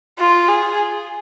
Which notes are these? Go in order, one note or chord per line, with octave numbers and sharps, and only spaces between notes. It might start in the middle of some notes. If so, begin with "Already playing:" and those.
F4
G#4